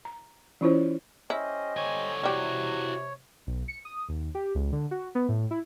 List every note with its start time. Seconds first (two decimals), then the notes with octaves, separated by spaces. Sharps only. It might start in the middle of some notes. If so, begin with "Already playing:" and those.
0.05 A#5
0.61 E3 C#4 E4 F4 C5 C#5
1.30 C#4 E4 G4 C5 D#5
1.77 D3 C#5 G#5
2.24 C3 G3 E4 F#4 G4
3.47 B1
3.68 C#7
3.85 D#6
4.09 D#2
4.35 G4
4.55 C#2
4.72 D3
4.91 F#4
5.15 B3
5.29 A2
5.51 E4